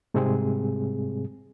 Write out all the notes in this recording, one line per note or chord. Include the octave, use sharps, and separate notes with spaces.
G#2 C3 G3 G#3 C4 G#4